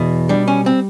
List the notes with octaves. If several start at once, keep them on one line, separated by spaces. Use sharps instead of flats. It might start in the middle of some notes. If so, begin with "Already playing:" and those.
Already playing: E2 B2
G3 D4
C#4
C4